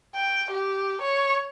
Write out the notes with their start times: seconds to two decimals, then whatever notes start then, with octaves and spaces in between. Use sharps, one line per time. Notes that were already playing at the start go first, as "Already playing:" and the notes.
0.15 G5
0.51 G4
1.02 C#5